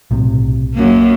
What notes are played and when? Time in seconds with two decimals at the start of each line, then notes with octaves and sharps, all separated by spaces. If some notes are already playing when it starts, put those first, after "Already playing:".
0.11 B1 A2 C3
0.74 F#2 A#3